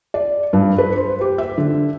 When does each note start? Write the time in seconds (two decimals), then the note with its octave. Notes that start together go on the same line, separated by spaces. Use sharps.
0.14 D5
0.53 G2
0.78 B4
0.96 C5
1.21 G4
1.38 E5
1.58 D3